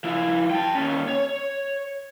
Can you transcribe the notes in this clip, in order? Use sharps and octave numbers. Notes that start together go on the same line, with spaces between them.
F3 E4
G5 A5
D#2 C#4
C#5